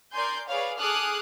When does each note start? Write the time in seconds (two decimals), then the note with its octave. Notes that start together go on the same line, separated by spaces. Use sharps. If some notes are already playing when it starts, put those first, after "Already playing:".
0.13 A#4 D5 G#5 C6 G6
0.48 G#4 B4 C#5 D5 F5
0.78 G#4 A4 D6 D#6 F6 F#6